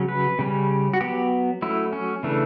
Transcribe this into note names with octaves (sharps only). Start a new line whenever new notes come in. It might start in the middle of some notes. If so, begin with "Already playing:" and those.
Already playing: C#3 F#3 C#4
B4
C#3 G3 C#4
F#4
F#3 B3 G4
F#3 A3 C#4 E4
C#4
C#3 E3 A3 D4